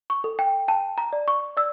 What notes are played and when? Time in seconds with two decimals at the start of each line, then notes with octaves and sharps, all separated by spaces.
0.10 C#6
0.24 A4
0.39 G5
0.68 G5 A5
0.98 A#5
1.13 D5
1.28 C#6
1.57 D5 E6